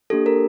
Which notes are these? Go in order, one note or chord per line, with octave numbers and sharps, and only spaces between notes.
A#3 D4 G4 A4
A#4